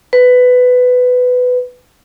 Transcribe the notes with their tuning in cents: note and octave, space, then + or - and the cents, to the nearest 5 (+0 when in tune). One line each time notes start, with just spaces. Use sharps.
B4 +15